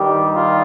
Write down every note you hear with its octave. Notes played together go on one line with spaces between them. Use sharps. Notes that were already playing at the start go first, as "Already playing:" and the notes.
Already playing: G2 D#3 G3 G4
F4